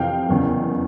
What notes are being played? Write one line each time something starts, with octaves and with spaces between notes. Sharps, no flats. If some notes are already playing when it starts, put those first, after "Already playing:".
Already playing: F2 C3 E3 F5 G5
F#1 E2 C#3